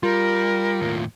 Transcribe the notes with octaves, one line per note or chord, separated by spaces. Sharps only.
G3 F4 A#4
D#2 A2